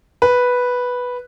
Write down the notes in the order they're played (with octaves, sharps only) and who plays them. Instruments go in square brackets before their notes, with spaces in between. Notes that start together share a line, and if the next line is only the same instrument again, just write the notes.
[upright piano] B4